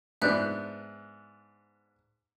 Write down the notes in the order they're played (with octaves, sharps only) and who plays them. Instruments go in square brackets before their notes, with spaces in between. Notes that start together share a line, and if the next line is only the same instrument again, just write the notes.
[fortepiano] G#2 B3 D4 [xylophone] E5 F#6 G6